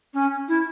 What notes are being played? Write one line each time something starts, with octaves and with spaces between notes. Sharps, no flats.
C#4
E4